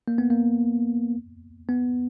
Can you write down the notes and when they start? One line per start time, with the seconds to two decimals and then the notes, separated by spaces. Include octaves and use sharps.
0.08 A#3
0.18 B3
0.30 A#3
1.69 B3